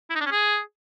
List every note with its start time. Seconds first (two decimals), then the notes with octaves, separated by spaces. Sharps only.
0.10 E4
0.15 D#4
0.21 D4
0.26 C#4
0.31 G#4